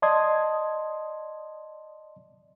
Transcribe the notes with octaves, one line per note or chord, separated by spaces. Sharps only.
D5 D#5 A5 C6 D#6 G#6